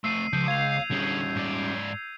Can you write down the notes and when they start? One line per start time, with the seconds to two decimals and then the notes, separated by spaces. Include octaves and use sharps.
0.04 F3 A3 E6 C7 D#7
0.33 C#2 F3 G6
0.48 F5 G#6 F7
0.91 D3 G3 C#4 G#4
1.36 G#2 D5